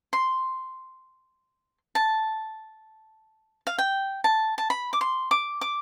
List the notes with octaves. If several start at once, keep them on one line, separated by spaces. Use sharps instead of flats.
C6
A5
F5
G5
A5
A5
B5
D6
C6
D6
D6